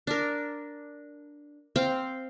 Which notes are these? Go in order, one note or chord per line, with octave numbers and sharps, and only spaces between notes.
D4 A#4
C4 F5 G5